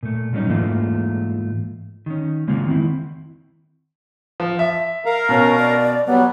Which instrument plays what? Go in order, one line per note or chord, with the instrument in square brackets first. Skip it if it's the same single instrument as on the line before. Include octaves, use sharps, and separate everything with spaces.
[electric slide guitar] A#2 A3
A#2 F#3 G3 C#4 D#4
G#2 E3 A3 A#3 F4
D#3 C#4
C#3 G#3 A#3 C4 F4
D#3 C4 E4
[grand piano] F3
E5
[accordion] A#4 F5 A#5
[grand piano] B2 [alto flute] C#4
[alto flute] D5
[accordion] F#3 G3 [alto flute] B3